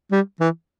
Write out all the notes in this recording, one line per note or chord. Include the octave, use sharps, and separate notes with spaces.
G3
E3